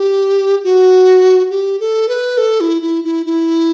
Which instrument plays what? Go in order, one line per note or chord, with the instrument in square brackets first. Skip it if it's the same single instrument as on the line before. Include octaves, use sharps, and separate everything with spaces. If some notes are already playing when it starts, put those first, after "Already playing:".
Already playing: [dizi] G4
F#4
G4
A4
B4
A4
E4
E4
E4
E4